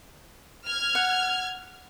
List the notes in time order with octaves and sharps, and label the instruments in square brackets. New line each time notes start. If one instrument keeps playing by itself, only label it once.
[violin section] F6 G#6
[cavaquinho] F#5